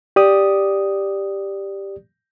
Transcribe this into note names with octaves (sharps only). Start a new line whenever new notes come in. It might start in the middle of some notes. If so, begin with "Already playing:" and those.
G4 D5 D#6